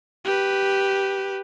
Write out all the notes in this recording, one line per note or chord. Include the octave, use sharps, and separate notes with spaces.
G4 B4